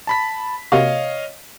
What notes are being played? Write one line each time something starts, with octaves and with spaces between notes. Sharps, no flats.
A5 B5 B6
C3 A#3 F#4 C#5 D#5 F5